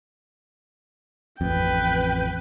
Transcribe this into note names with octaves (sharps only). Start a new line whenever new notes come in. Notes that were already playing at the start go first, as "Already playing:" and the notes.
A1 F2 B4 G5